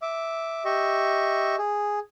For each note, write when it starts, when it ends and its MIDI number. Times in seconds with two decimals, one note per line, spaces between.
0.02 0.64 76
0.02 0.64 86
0.65 1.56 67
0.65 1.56 75
0.65 1.56 76
0.65 1.56 85
1.58 1.99 68